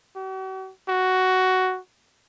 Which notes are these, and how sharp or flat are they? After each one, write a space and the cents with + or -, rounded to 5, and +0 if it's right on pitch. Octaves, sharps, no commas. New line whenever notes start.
F#4 +45
F#4 +10